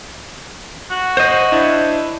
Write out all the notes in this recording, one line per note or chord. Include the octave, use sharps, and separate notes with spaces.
F#4
C5 D#5
D4 E4